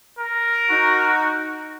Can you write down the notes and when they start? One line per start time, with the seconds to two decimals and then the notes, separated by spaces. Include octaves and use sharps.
0.19 A#4
0.70 D#4 F#4